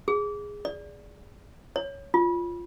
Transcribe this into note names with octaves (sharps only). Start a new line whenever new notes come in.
G#4
D5
C#5
F4